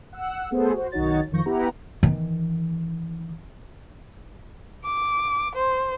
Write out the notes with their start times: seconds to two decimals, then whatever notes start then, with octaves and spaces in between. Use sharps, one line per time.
0.13 F#5 E6
0.51 A3 B3 G#4 A4 C5
0.73 F#4 C5
0.92 B1 D#3 D#4 F#4 C#5 A6
1.32 F2 D#3 F3 C#6 G6 A#6
1.46 B3 E4 G4 B4 F#5 A#5
2.03 D#3 E3
4.84 D6
5.55 C5